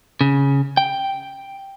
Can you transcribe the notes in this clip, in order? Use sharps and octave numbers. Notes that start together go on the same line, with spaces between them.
C#3
G5